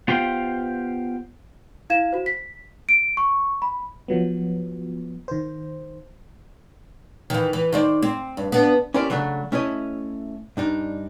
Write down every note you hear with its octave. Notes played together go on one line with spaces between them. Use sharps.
B3 F4 G4 C5 F5 G5
E4 F5 G#6 E7
F#4 C5
B6
D7
C#6
B5
F3 F#3 B3
D#3 C5
D#3 E3
E3
D#3 C5 D5
C4
G2
B3 D4
C#4 E4 G4 A#4 C5 D5
C#3 F#3 A3 D4
A3 C#4 E4 C#5 D#5
G2 D4 D#4